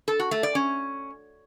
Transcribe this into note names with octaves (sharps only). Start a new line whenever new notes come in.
A4
F#4
A3
D5
C#4